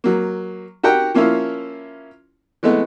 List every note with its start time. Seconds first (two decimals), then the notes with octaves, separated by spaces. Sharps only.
0.04 F#3 A#3
0.83 F#4 G4 A#4 F#5 G5
1.14 F3 A#3 C#4 E4 F4
2.63 E3 G#3 A3 B3